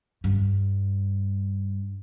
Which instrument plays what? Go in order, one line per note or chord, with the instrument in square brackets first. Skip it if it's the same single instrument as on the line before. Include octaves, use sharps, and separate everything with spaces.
[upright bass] G2